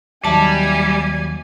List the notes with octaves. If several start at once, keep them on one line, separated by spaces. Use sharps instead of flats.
D#2 F#3 G3 E5 G#5 A5